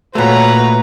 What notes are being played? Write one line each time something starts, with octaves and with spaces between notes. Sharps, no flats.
A#2 A3 F#4 B4 C#5 A#5